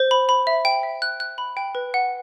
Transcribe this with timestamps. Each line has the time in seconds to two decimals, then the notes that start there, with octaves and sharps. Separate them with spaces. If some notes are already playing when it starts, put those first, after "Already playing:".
Already playing: C5
0.11 B5
0.29 B5
0.47 E5
0.65 G5
0.83 E5
1.02 F#6
1.20 F#6
1.38 B5
1.57 G5
1.75 B4
1.94 F#5